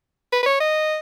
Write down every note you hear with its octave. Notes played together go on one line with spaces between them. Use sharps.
B4
B4
C#5
D#5